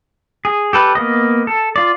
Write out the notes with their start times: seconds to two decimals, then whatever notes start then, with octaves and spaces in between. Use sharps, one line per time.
0.45 G#4
0.73 G4 A4 B4
0.95 A#3 B3 D#5
1.47 A4
1.76 F4 D5